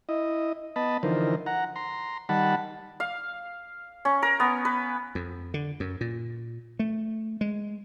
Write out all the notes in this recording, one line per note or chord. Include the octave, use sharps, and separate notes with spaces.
E4 D#5
B3 D#5 A5 B5
D3 E3 F3 D#4 A#4 C5
F#5 A#5
A#5 C6
D#3 G3 F#5 A5 B5
F5
C#4
A#4
B3
B4
F2
D3
F#2
A#2
A3
G#3